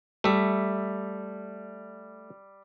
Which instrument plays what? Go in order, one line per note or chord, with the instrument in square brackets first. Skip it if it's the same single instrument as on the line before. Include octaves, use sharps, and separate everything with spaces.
[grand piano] G3 [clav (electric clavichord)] A3 E5